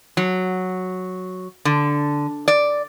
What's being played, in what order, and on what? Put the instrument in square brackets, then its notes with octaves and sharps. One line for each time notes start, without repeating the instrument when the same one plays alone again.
[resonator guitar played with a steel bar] F#3
D3
D5